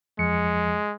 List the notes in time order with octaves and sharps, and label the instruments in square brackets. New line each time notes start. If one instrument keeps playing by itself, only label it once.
[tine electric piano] F2 F3 C#7 [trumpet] G#3